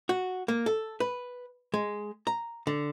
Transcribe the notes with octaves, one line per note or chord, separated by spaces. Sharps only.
F#4
A#3
A4
B4
G#3
A#5
D3